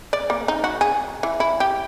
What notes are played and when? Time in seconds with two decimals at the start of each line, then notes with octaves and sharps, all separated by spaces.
0.13 D5
0.30 A#3
0.48 D#4
0.64 F#4
0.81 G#4
1.23 E3
1.40 E4
1.60 G4